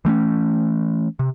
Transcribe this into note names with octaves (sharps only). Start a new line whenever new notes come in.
E3 A3 C4 C#4
C3